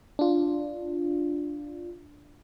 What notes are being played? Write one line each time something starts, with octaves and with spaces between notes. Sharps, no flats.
D4 F4